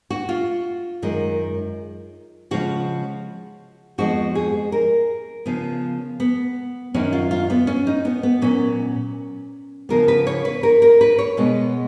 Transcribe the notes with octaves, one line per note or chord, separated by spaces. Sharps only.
F#4
F4
F#2 D#3 G#3
C#3 F3 G#3 F#4
F2 F3 G#3 B3 F#4
G#4
A#4
C#3 F3 B3
B3
F#2 D#3 F#3 C#4
F4
F4
B3
C#4
D#4
B3
B3
A#2 F#3 B3 C#4
C#3 F3 B3 A#4
B4
C#5
B4
A#4
A#4
B4
C#5
B2 G#3 B3